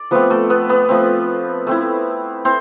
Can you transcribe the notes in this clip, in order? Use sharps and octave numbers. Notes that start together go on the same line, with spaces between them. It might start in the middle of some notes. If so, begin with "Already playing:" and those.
Already playing: D5
F3 A3 B3 C4 B4
A3 A4
B3 B4
B3 B4
F3 A3 C4
A3 C4 E4
C4 E4 C5